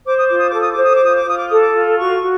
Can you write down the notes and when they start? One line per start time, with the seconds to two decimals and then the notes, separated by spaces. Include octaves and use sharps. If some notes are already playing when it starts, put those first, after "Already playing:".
0.05 C5 D6
0.16 D#6
0.27 F4 D6
0.38 D#6
0.49 A4 D6
0.60 D#6
0.71 D6
0.77 C5 D#6
0.94 D6
1.02 F4 D#6
1.16 D6
1.26 F4 D#6
1.38 D6
1.49 A4 D#6
1.60 D6
1.74 F4
1.98 F#4 C#6
2.22 F#4